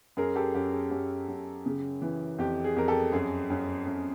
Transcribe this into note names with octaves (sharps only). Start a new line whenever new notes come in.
F#2 G#4 A#4
G4 A4
F#2 G4
G#4
F#2 G4
F#2
C#3
E3
F2 G4
G#4
F2 A#4
G4 A4
F#2 G#4
F#2
F#2